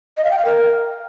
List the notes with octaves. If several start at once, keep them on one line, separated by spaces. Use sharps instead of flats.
D#5
F5
G5
F5
A#4